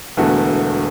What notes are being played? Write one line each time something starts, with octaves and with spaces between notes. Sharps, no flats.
E1 E2 D3 A3 F#4